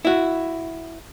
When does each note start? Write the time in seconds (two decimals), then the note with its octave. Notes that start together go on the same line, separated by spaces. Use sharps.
0.05 E4 F#4